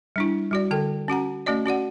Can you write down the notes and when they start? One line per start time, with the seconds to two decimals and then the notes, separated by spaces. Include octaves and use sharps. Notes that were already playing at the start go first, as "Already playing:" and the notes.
0.16 G3 D4 E4
0.51 G3 F#4 D5
0.71 D3 A4 G5
1.08 C#4 F#4 F#5 A#5
1.46 A3 C#4 F#4 D5 D#5
1.66 C#4 F#4 D5 F#5